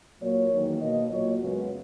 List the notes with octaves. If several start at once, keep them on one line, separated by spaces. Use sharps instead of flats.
A#2 F#3 A#3 C#5
E2 D#3 F#3 A#3
B2 A#3 D#5
A#2 F#3 A#3 C#5
F#2 C#3 G#3 B3 F#4